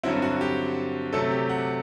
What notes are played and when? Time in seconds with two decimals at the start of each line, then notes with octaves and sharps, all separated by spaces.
0.03 G2 D3 F#3 C4 E4
0.22 F#4
0.41 G4
1.13 C3 F#3 A3 A4
1.31 G4
1.49 F#5